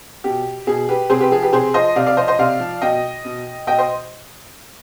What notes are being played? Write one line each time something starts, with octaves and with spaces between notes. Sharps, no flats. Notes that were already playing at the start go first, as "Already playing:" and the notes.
B2 G4
B2 G#4
G4 B4
C3 G#4 C5
G4 B4
F3 G#4
G4 B4
C3 G#4 C5
F3 C5 D#5
C3 D5 F5
D5 F5
F3 C5 D#5
C5 D#5
C3 D5 F5
F3
B2 D#5 G5
B2
B2 D#5 G5
C5 D#5